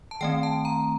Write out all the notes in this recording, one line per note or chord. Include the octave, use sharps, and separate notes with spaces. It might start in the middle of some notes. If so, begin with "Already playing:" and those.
A5
D#3 A3 C4 G5
A5
A#5